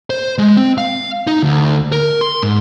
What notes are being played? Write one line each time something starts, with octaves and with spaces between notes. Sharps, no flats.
C5
G#3
C4
F5
D#4
D2
A#4
C6
G#2